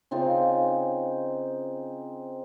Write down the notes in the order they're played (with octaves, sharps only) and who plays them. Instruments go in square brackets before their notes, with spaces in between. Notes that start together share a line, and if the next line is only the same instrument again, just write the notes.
[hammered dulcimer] C#3 C4 D#4 F4